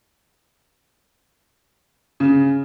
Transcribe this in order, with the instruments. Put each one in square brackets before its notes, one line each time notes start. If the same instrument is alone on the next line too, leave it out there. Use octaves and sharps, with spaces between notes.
[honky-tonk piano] C#3